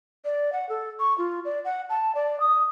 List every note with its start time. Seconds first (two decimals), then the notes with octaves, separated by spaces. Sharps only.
0.25 D5
0.53 F#5
0.69 A4
1.00 C#6
1.18 F4
1.45 D5
1.65 F#5
1.90 A5
2.15 D5
2.40 D#6